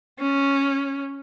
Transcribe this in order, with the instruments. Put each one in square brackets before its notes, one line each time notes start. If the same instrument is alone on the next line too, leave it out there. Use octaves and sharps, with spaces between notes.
[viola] C#4